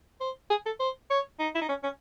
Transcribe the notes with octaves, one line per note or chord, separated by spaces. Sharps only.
C5
G#4
A4
C5
C#5
D#4
E4
D#4
C#4
C#4